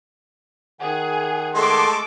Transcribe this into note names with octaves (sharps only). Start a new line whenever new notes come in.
D#3 G#4 F#5
G#3 A3 A4 C6 D6